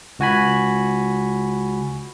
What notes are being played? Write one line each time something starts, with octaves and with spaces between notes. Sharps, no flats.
C#2 F#4 G#5 B5